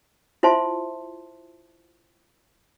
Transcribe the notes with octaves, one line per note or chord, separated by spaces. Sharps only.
E4 F4 C5 E5 A5 C6